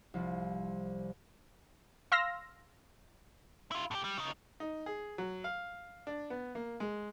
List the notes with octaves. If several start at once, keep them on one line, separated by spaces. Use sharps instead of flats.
C2 F3
F5 C6 E6 F6 A#6
E4 F4
A2 G4
G3
C#3 D#4
D#4
G#4
F#3
F5
D4
B3
A#3
G#3